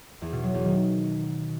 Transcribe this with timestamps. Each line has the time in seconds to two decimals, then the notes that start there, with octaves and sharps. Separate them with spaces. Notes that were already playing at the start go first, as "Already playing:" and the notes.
0.21 E2
0.32 B2
0.43 F#3
0.54 E2
0.65 D#3